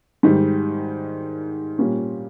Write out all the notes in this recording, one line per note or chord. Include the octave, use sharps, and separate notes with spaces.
G#2 D#3 G3
A#2 G3 A#3 C#4